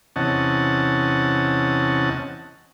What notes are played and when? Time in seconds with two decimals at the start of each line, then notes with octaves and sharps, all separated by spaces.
0.16 E2 C3 C#4 D#5 F#5 A5